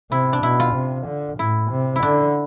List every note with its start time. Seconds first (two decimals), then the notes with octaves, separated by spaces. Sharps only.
0.11 C3 E4
0.33 D4
0.43 B2 E4
0.60 F4
0.75 C3
1.07 D3
1.39 A2 E4
1.71 C3
1.96 E4
2.03 D3 D4